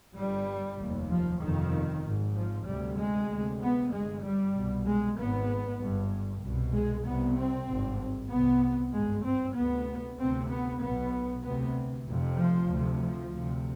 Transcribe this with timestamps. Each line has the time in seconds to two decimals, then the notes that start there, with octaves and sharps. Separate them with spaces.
0.15 G1 G2 G3
0.78 F1 D#2
1.09 F3
1.41 G1 F2 C3 D#3
2.04 G#1 G#2
2.35 F3
2.66 D2 C3 G3
2.97 G#3
3.29 D2 C3
3.60 B3
3.91 G1 G2 G#3
4.23 G3
4.54 C2 B2
4.85 G#3
5.16 G#1 G#2 B3
5.80 G1 G2
6.41 C2 B2
6.73 G#3
7.04 C2 C3 B3
7.36 C4
7.67 G#1 G2
8.29 C2 C3 B3
8.92 G#1 G2 G#3
9.24 C4
9.55 D2 C3 B3
10.18 D2 C3 C4
10.49 B3
10.80 B1 B2 B3
11.43 D2 C3 B3
12.06 F1 F2 C3
12.37 F3
12.69 D2 C3
13.00 F3
13.31 D2 C3